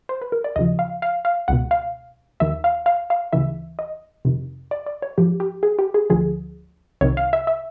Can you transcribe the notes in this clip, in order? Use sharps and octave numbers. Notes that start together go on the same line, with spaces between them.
C5
B4
A#4
D5
D#2 C#3 F3 D#5
F5
F5
F5
C#2 B2 F#5
F5
D#2 D#3 E5
F5
F5
F5
D2 C#3 E3 E5
D#5
F2 C3 D#3
D5
D5
C#5
G#2 F3 G4
G4
G#4
G4
G#4
D2 D3 F3 G#4
C2 C3 D#3 C#5
F5
E5
E5